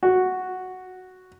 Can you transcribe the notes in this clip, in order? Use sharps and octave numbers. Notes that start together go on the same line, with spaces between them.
F#4